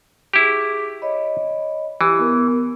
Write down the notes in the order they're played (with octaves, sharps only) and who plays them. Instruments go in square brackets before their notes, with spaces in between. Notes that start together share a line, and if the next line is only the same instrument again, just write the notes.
[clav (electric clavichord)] E4 G4 [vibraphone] G#4 C#6 D6
[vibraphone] C#5 D#5 B5
[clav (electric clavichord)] E3 [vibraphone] E4 G4
[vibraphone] B3 A#4